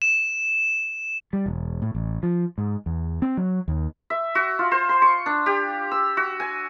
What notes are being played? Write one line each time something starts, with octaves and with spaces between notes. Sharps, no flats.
E7
G3
E1
A2
A1
F3
G#2
E2
C4
F#3
D#2
E5
F#4
F4
C5
C6
C#6
D4
G4
E6
F#4
G#5